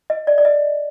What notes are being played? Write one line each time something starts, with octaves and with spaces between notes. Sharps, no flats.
D#5
D5
D5
D#5